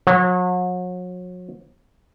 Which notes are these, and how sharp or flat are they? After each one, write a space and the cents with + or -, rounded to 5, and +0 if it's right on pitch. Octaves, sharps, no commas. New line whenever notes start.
F#3 -35